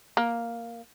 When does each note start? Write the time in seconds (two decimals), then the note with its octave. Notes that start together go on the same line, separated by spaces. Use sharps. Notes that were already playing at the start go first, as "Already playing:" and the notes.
0.17 A#3